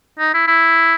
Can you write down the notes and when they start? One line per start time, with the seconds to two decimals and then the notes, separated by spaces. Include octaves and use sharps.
0.19 D#4
0.34 E4
0.48 E4